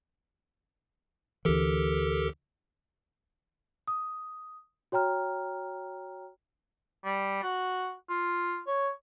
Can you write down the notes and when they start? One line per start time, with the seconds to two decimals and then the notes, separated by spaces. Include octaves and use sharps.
1.45 D2 E3 G4 A4 A#4
3.88 D#6
4.92 F#4 C#5 G5 A#5 F6
7.05 G3
7.43 F#4
8.09 F4
8.67 C#5